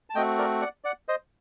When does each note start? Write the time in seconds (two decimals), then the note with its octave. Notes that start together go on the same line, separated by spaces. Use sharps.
0.10 A5
0.15 A3 C4 F#4 D#5 G5
0.38 A#4 D5
0.61 D5 F#5
0.84 D5 F#5
1.08 C5 D#5